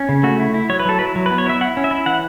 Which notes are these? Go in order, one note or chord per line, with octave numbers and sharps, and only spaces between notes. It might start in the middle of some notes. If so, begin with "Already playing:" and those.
Already playing: C#4
C#3
A3 F#4
E4
E4
F#3 C#5
B4
F#3 A4
E4 B4
F#3
B3 B4
C#5
E4 E5
E4 F#5
C#4
E5
E4
E3 F#5